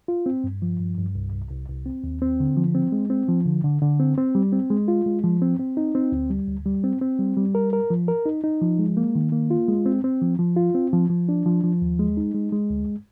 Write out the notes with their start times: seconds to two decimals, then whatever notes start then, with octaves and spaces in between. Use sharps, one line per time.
0.08 F4
0.26 C4
0.44 G2
0.62 F3
0.80 G2
0.97 G2
1.15 C2
1.33 C2
1.51 C2
1.68 C2
1.86 C4
2.04 D#2
2.22 C4
2.40 D3
2.57 F3
2.75 C4
2.92 G#3
3.10 C4
3.29 F3
3.46 D3
3.64 D3
3.82 D3
4.00 C4
4.18 C4
4.35 G3
4.52 C4
4.70 G#3
4.88 F4
5.06 G#3
5.23 F3
5.42 C4
5.59 C4
5.77 D#4
5.95 C4
6.12 D2
6.30 G3
6.48 D2
6.66 G3
6.84 C4
7.01 C4
7.19 G3
7.37 G3
7.55 A#4
7.73 A#4
7.90 F3
8.08 A#4
8.26 D#4
8.44 D#4
8.61 F3
8.79 G#3
8.97 A#3
9.15 D#3
9.32 A#3
9.51 F4
9.68 G#3
9.86 C4
10.04 C4
10.22 F3
10.39 F3
10.57 F4
10.74 C4
10.93 F3
11.10 F3
11.29 D4
11.46 F3
11.63 F3
11.82 D#2
11.99 G#3
12.17 D#4
12.34 G#3
12.52 G#3
12.70 D2